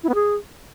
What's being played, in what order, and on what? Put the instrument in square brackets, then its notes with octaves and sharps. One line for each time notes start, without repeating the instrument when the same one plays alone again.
[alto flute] E4
B3
G#4